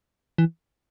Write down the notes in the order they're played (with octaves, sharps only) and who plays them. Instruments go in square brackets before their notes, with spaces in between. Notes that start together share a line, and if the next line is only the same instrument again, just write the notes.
[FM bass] E3